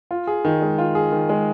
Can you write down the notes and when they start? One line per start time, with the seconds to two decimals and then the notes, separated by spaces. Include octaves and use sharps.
0.11 F4
0.27 G#4
0.45 D#3
0.62 G#3
0.78 F4
0.95 G#4
1.12 D#3
1.29 G#3